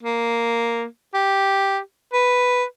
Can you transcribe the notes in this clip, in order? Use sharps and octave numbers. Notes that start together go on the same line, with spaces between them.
A#3
G4
B4